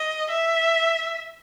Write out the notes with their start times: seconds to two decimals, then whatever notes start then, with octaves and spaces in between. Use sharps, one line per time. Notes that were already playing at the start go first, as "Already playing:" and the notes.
Already playing: D#5
0.31 E5